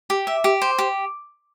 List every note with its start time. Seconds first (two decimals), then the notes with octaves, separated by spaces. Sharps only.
0.10 G4
0.27 E5
0.44 G4
0.62 C5
0.79 G4